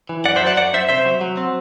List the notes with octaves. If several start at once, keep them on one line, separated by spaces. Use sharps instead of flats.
E3
F#2 D5 F#5
C5 E5
F#3
D5 F#5
F#2 D5 F#5
F#2 C5 E5
C3 C5 E5
F#3
F#3
C4